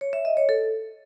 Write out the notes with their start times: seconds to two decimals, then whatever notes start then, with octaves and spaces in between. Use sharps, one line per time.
0.01 C#5
0.13 E5
0.25 D#5
0.37 C#5
0.49 A4